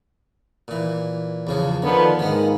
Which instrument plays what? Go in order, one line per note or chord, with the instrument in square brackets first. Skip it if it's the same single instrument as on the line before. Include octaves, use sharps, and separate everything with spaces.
[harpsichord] A#2 E3
E2 C#3 F3
[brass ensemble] D3 F3 B3 [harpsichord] D#3
[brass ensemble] G#2 A#3 [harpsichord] D#3 B3